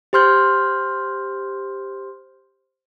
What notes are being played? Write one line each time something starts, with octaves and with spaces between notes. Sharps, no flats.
G4 C5 C6 F6 G6